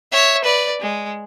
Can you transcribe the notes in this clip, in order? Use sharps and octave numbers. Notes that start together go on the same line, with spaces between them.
C#5 E5
B4 D5
G#3